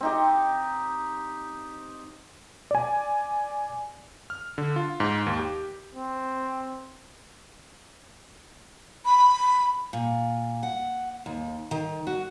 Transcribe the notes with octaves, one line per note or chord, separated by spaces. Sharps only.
C4 D#4 G4
D5 G#5
F6
D3
F4
G#2
D#2
G4
C4
B5
A#2
F#5
D#2
D#3
F#4